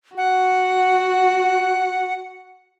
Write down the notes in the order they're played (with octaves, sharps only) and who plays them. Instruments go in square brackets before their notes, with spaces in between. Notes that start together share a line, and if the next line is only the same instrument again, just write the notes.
[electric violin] F#4 [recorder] F#5